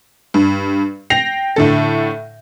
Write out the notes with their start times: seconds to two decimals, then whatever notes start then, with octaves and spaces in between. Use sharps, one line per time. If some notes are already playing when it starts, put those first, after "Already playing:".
0.34 G2
1.10 G5 A#6 C7 F7
1.56 A2 D3 A4